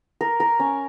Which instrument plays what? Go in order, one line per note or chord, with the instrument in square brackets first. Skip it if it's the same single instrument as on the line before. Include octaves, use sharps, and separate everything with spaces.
[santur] A#4
A#4
C#4